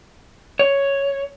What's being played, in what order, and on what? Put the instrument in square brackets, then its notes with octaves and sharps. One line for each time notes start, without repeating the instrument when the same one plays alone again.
[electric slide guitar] C#5